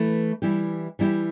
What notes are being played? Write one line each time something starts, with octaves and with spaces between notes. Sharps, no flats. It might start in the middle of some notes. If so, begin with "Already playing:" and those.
Already playing: E3 A3 E4 B4
E3 G3 E4 G4
E3 G3 E4 G4